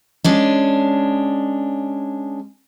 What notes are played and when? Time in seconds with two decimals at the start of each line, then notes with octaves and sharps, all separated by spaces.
0.24 G#3 C#4 D4